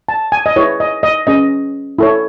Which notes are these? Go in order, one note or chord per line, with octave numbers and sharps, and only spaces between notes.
A5
G#5
D#5
E4 G#4 B4 C#5
D#5
D#5
C#4 G#4 B4 D#5
E4 A4 C#5